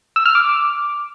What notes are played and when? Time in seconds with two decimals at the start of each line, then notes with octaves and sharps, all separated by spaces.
0.16 E6
0.26 F6
0.35 D6